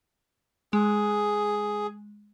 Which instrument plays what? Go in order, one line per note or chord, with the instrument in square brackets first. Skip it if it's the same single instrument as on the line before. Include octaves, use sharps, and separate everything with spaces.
[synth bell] G#3 [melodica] G#4